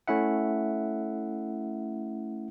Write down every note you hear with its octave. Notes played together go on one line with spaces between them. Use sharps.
A3 C#4 E4 E5 F#5